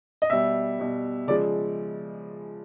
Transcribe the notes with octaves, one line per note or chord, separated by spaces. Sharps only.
D#5
B2 G3 E5
B2 G3
C#3 F3 G#3 D5